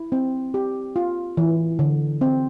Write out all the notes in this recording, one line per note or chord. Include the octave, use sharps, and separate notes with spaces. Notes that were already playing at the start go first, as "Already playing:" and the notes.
Already playing: E4
C4
G4
F4
E3
D3
C4